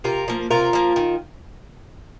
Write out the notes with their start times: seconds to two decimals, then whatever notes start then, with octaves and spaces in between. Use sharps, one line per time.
0.04 C3 F4 A#4
0.28 F3 A#3
0.50 C3 F4 A#4
0.73 F3 A#3
0.96 D#3